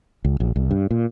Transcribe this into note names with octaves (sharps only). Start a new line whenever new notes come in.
C#2
A#1
C2
G2
A#2